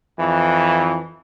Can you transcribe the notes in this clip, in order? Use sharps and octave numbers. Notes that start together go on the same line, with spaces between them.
F2 E3